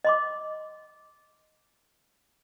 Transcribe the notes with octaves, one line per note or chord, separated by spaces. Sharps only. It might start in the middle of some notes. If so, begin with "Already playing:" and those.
D#5 C6 D6